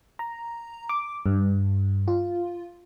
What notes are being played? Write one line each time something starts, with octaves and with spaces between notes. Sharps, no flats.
A#5
D6
G2
F4